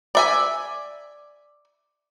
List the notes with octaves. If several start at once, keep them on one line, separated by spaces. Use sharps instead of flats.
D5 E5 G#5